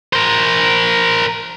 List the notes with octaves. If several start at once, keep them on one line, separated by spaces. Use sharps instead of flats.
A#4 C5